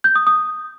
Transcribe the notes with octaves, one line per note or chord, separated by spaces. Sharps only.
G6
D#6
D#6